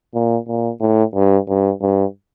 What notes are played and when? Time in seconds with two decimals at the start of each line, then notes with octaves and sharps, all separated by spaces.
0.15 A#2
0.48 A#2
0.81 A2
1.15 G2
1.48 G2
1.82 G2